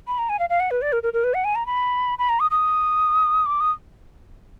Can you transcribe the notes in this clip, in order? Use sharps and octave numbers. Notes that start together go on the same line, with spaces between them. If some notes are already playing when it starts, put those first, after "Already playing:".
B5
A#5
G#5
F5
F5
F#5
B4
D5
A#4
A#4
A#4
B4
F#5
G#5
A#5
B5
B5
A#5
D#6
D#6
D6
D#6